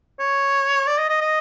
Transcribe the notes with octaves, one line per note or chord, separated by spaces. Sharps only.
C#5
D5
D#5
D#5
D#5